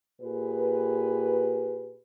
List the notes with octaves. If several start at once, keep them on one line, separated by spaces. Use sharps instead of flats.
A#2 G4 G#4 B4